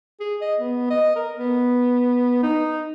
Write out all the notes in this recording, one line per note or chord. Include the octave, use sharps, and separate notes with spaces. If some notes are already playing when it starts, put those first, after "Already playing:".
G#4
D#5
B3
D#5
A#4
B3
D#4